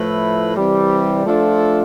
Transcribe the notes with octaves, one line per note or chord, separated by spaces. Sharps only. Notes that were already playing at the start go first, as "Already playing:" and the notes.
Already playing: A2 F3 A3 E4 B4
C3 E3 G3
F3 A3 D4 F4 A4